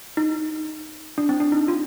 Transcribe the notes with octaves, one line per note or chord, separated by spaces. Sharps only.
D#4
D4
C4
D4
D#4
F4